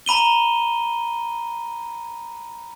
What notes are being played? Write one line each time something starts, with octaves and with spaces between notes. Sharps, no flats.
A#5 B5 D#7 G7